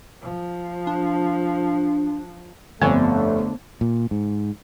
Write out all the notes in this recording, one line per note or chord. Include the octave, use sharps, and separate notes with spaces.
F3
D4
G1 F2 D3 A3 B3 C#6
A#2
G#2